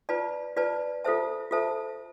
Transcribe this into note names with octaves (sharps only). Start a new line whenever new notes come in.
F4 B4 D5 A5
F4 B4 D5 A5
F4 A4 C5 E5 A5
F4 A4 C5 E5 A5